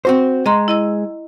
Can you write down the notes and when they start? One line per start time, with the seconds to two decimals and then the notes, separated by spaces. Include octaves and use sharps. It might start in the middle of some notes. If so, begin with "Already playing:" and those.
0.05 C4 F#4 C5
0.46 G#3 D#5 A#5 C6
0.68 E4 D#5 E6